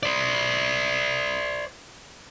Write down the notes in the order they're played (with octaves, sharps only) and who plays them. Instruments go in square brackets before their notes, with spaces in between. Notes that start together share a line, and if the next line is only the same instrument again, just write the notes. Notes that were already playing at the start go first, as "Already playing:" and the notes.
[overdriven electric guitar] C5 D5